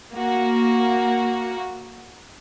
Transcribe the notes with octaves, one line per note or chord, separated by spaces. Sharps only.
A#3 F#4